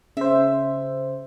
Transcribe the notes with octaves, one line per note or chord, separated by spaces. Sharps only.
C#3 C5 E5